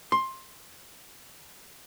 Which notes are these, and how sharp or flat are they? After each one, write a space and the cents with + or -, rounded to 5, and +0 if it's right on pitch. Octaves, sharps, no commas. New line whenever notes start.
C6 +15